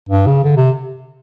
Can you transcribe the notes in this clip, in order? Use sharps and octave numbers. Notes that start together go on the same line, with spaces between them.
G2
C#3
D3
C3